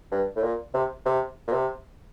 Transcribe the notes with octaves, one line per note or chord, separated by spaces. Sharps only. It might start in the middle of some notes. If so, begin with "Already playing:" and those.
G2
A2
A#2
C3
C3
A#2
C3